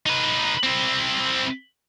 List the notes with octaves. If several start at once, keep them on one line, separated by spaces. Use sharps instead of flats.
D#4 B4
C4 E4